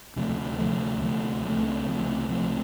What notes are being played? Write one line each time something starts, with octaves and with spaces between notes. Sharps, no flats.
D2 C3 F3 A3
D2 C3 F3 A3
D2 C3 F3 A3
C#2 C3 F3 A3
C#2 C3 F3 A3
C#2 C3 F3 A3